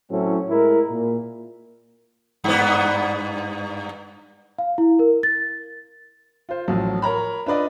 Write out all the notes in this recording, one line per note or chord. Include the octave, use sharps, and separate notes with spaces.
A2 F#3 C4 C#4 E4 A4
A2 G#3 E4 A#4
A#2
G2 B3
F5
E4
A#4
A6
F4 C5
A1 F3 F#3
A#4 C#5 A#5 B5
D4 F4 B4 D5 D#5